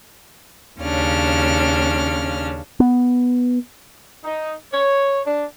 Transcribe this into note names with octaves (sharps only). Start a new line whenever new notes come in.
D#2 C#3 C#4 D4 F6
B3
D#4
C#5
D4